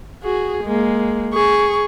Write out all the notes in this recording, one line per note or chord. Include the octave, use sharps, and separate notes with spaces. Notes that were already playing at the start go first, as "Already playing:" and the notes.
F#4 G#4
G#3 A#3
G#4 C#6